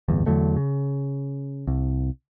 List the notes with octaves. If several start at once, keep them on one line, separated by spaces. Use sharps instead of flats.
D1 G1 E2
E2 D3 F#3 A3
C#3
C2